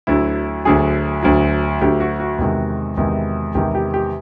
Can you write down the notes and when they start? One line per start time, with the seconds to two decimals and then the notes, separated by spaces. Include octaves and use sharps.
0.07 D2 D3 F#3 E4
0.65 D2 D3 F#3 G#4
1.23 D2 D3 F#3
1.81 D2 D3 F#3 G4
2.00 F#4
2.20 F#4
2.38 E2 C3 D#3 G#3
2.97 E2 C3 D#3 G#3
3.55 E2 C3 D#3 G#3 G4
3.75 G4
3.94 G4